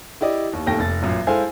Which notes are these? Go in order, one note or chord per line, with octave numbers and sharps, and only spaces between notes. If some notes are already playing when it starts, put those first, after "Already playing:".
E4 G4 D5 D#5
D#2
D#1 D#2 A3 G5 A#6
F1 A6
A1 F#2 A#2
G#3 E4 A4 C5 F5 G#5